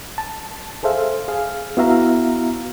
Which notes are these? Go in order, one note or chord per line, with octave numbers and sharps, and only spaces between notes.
A5
G#4 A4 C5 E5 F5
G#4 F5
B3 E4 F#4 E5 F5 A#5